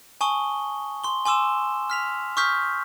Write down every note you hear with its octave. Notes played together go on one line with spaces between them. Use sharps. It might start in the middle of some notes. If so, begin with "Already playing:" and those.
G#5 A5 C#6 D#6 G7
C6 G7
G#5 C6 D6 E6 E7
F6 B6 F7
C#6 D#6 F6 G6 B6